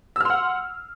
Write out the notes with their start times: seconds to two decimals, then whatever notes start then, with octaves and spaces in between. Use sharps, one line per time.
0.16 E6
0.21 F6
0.25 C6
0.30 F#5